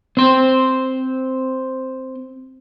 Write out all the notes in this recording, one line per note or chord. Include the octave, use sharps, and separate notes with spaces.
C4 C5